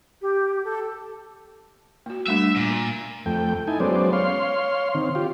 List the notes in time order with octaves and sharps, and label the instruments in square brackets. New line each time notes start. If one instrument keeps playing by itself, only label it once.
[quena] G4
A4
[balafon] A#3 F#4
[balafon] G3 A3 D4 [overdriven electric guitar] E5
[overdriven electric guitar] A#2
[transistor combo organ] F2 A3 G5
D#4 E4 A4 G#5
F#3 G#3 B3 C#4 C5 D5
C#5 F5 C6
D#3 C4
F4 G4